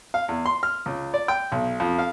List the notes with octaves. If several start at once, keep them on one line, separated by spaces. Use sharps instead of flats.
F5
E2
C6
F6
C#2
D5
G5
B1
F2
F5